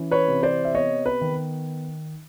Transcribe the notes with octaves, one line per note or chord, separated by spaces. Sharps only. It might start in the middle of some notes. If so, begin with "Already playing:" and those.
Already playing: E3 C#4
B4 C#5
C3
C5 D5
E5
B3 C#5 D#5
B4
D#3